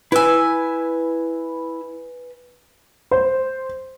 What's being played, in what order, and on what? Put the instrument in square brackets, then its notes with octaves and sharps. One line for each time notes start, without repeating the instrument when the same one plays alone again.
[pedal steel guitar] E4 E6 [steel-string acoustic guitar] B4 G#5
[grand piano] C5